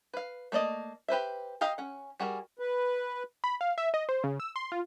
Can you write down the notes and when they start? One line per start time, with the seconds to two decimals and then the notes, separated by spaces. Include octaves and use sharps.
0.14 B4 F5
0.52 A3 A#3 D5 D#5
1.08 G4 B4 C5 E5
1.61 G4 D#5 F5 A#5
1.78 C#4 F#5
2.20 G3 F#4 G#4 A#4
2.59 B4
3.44 B5
3.61 F5
3.78 E5
3.94 D#5
4.09 C5
4.24 C#3
4.40 E6
4.56 C6
4.72 F4